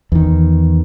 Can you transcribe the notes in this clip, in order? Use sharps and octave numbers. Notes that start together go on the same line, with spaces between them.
E2 D#3